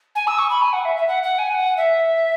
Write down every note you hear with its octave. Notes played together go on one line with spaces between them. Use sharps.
G#5
E6
C#6
B5
G#5
F#5
E5
E5
F#5
F#5
G#5
F#5
E5